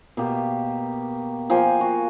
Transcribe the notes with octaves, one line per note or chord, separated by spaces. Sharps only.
B2 A#3 G4
F3 A#3 G5 G#5
F#4